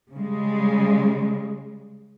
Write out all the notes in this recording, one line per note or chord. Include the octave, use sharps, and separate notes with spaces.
C#3 G3 G#3